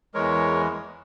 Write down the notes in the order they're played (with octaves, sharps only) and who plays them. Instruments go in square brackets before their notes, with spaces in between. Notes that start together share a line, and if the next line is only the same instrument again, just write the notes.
[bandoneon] E2 E3 G#3 A#4 C#5